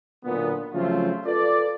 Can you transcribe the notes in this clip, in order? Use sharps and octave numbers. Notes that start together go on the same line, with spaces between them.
B1 A#2 D3 B3
C#3 F3 F#3 A3 C4 F4
F4 A4 B4 D5